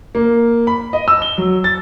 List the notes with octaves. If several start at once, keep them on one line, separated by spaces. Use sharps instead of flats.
A#3
B5
D#5
E6
G7
F#3
A6